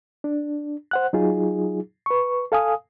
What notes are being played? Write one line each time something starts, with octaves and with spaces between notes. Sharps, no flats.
D4
C5 F#5 F#6
F#3 D#4 F4 G#4
B4 C#6
A4 F5 G#5 D#6